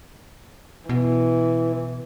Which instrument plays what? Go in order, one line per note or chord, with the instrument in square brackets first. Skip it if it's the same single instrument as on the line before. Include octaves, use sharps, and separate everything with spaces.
[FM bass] B2 [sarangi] E3